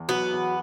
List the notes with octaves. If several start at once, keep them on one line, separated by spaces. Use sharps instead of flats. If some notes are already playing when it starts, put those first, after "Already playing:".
Already playing: E2
F#3 B3
E2